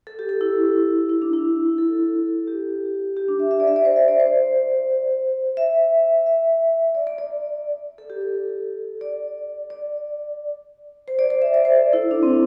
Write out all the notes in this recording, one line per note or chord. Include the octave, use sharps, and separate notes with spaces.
A4
G4
A4
E4
E4
D4
E4
A4
G4
G4
D4
E5
E5
D5
E5
D5
C5
E5
D5
C5
E5
E5
D5
D5
D5
A4
G4
A4
D5
D5
C5
D5
D5
E5
D5
C5
A4
E4
D4
C4